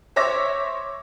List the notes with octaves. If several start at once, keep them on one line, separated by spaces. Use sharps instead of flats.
C5 C#5 E5 D6 A#6